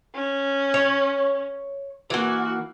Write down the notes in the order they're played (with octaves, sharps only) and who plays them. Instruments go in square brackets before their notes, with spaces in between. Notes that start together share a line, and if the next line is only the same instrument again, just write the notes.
[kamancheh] C#4
[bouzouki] C#5
[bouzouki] E3 A#3 [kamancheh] F#4